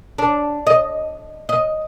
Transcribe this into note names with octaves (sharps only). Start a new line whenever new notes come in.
D4
D#5
D#5